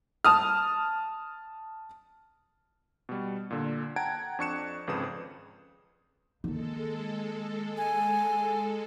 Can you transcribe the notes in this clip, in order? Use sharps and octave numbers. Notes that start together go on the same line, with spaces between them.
A5 D#6 F6
B2 G3
A#2 D3
F#5 G5 A5 A#5 G#6 D7
F2 D4 C#6 F#6 C#7 E7
G#1 F2 C#3 B4 D#6 E7
D#3 G#3 A#3 A4
G#5